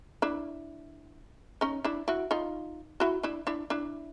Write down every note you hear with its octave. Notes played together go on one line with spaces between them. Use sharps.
D4 E4
C#4 D#4
D4 E4
E4 F#4
D#4 F4
E4 F#4
D4 E4
D4 E4
D4 E4